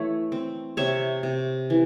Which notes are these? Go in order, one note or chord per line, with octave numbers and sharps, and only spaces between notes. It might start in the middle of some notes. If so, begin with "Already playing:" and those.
Already playing: E3 A3 C#5 E5
C4
C3 C#5 E5
C3
E3